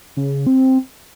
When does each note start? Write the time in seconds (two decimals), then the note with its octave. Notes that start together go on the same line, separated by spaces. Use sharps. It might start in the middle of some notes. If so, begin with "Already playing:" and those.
0.17 C#3
0.47 C4